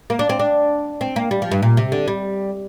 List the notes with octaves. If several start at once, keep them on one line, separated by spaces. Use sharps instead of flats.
A#3
D4
C4
D4
C4
A#3
G3
F3
G2
A#2
C3
D3
G3